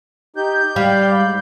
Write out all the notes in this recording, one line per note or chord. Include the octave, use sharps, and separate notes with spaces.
D#4 G4 G6
G3 D5 F5 B5
G#2 B5